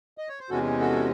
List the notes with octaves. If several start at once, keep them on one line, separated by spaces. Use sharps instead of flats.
D#5
C#5
C5
E2 C3 E3 G#3 C#4 F#4 A4
F#4 A4